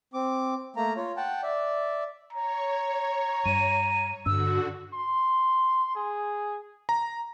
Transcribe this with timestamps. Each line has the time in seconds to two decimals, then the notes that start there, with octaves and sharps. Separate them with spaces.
0.14 C4 D6
0.76 A3 A#3 A#5
0.97 F4 C#5
1.17 F#5 G5 A5
1.43 D5 E5
2.33 C#5 A#5
3.46 G2 D#7
4.26 G2 D3 D4 F#4 E6
4.93 C6
5.95 G#4
6.89 A#5